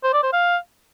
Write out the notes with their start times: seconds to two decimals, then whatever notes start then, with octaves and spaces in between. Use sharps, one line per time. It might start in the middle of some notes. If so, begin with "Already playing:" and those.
0.04 C5
0.13 D5
0.23 C5
0.33 F5